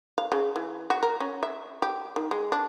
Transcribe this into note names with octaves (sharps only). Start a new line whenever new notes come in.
F5
C#3
E3
F#4
A#4
C#4
E5
G4
D#3
G#3
D4